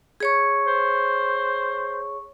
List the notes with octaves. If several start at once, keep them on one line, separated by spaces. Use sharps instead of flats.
G#4 C#5 C#6
C5